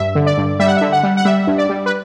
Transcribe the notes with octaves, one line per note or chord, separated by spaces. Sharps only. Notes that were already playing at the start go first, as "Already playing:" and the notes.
Already playing: G2 E5
D3
D5
G2
G3 E5
F#5
D3 E5
F#5
G3
F#5
G3 E5
G2
D5
G3
B4